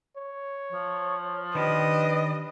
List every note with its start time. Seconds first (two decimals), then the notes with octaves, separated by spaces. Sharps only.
0.17 C#5
0.72 F3
1.55 D#3 D4 G4 B4 D#5